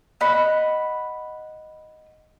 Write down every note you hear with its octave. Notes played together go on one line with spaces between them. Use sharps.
D#5 F#5 B5